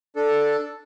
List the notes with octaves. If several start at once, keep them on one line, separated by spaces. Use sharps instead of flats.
D4 A4